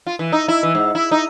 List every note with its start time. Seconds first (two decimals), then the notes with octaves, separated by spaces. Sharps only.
0.07 F4
0.19 E3
0.32 D#4
0.48 E4
0.63 E3
0.75 G#2
0.95 E4
1.11 D#4